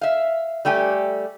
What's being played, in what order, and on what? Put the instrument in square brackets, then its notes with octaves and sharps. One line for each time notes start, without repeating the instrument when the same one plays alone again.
[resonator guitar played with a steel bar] E5 F5
G3 A3 G4 G#5